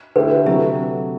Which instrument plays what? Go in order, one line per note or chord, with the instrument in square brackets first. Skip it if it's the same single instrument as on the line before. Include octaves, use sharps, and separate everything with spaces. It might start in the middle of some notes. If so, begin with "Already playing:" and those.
[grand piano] D3 A3 E4 G4 [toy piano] B4
[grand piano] C3 F#3 A3 E4 [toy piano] E5